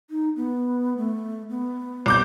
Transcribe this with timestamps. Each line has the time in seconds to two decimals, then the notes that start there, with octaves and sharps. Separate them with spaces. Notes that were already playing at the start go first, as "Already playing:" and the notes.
0.10 D#4
0.36 B3
0.97 A3
1.50 B3
2.06 C2 D6 G6